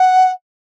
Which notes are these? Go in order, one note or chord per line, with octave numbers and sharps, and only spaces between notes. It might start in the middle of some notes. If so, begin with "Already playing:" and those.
Already playing: F#5